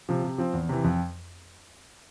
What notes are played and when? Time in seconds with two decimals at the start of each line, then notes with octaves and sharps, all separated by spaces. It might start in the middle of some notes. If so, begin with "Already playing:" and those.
0.09 C3 F3
0.24 C3
0.38 F3 C4
0.53 E2
0.69 C3 E3
0.84 F2